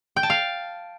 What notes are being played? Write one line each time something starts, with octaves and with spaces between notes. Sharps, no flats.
G5
A5
F5